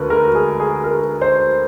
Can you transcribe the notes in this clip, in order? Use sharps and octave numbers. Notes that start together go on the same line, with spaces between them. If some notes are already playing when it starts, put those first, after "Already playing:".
Already playing: D2 A#4 B4
A#4
G#4
G#4
A#4
C5